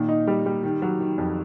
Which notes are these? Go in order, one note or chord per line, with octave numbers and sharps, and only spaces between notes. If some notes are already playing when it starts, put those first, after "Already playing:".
Already playing: A#2 D#3
D#4
G3
G3
D#3
F#3
D#3
F2